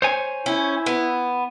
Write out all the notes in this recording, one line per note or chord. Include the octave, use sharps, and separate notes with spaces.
C5 C#5 G#5
C#4 E4
B3